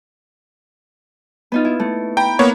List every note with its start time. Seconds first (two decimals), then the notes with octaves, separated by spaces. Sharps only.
1.52 B3 D#4 F4
1.65 E4
1.80 A3
2.17 G5 A#5 B5
2.39 A#3 B3 C#5